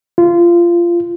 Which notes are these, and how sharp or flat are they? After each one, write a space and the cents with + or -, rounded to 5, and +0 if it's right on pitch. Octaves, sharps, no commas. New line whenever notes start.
F4 -20